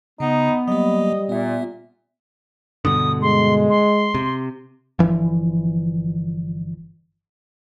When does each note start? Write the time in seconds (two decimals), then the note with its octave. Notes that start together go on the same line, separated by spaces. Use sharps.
0.20 C#3 B3 D#4
0.68 F#3 G3 A#3 D#5
1.29 A#2 B3 E5
2.85 G2 B2 D3 D#6
3.22 G#3 C6
3.70 C6
4.15 C3
4.99 G1 C#3 E3 F3